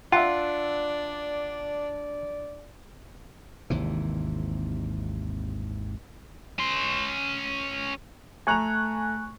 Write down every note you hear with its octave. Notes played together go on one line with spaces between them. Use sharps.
D4 F4 D5 E5 F#5
G#1 D#2 C3 E3
C#4 C6
A3 G#5 A#5 C#6 F#6 F7